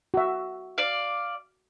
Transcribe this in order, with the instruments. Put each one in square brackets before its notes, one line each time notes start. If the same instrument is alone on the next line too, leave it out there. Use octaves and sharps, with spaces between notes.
[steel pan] F#4 E5
[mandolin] D5 F5